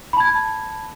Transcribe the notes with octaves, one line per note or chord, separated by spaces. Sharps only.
A5 B5 G#6